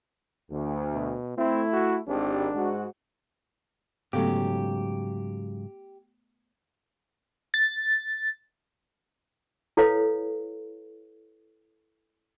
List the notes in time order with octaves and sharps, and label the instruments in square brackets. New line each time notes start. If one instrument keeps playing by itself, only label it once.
[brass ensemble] D2
[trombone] B2
[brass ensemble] A3 E4 [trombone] C4
[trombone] F#4
[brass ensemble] G#1 G4 [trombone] D4
[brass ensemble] G#2 F#4
[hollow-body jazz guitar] G#2 C#3 F#3 [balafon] A3 B3 A4 [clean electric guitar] G4
[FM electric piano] A6
[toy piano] E4 A4 B4 C#5 F5